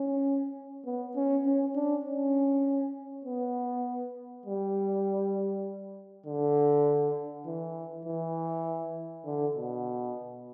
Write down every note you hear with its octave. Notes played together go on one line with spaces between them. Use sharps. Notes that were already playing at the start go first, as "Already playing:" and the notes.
Already playing: C#4
B3
C#4
C#4
D4
C#4
B3
G3
D3
E3
E3
D3
B2